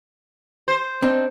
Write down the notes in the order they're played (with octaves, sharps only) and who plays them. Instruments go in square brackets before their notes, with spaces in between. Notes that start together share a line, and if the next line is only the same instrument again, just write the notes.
[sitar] C5
[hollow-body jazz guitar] C4 D4 D#4